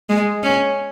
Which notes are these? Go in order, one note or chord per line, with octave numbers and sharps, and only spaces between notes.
G#3
C#4